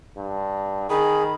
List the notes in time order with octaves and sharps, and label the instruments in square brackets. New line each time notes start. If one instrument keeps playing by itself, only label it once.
[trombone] G2
[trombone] D#3 [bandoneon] G#4 [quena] B5